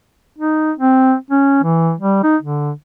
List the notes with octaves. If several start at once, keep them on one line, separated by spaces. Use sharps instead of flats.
D#4
C4
C#4
E3
G3
D#4
D3